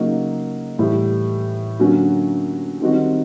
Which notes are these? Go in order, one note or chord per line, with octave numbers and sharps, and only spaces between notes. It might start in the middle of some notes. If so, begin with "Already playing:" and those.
Already playing: C#3 F#3 A#3 D#4 F#4
A2 E3 G3
D3 F#3 A#3 C#4 F#4
D#3 G3 C4 D#4 F#4